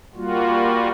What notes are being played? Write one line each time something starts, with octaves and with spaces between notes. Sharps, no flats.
G3 A#3 F4 F#4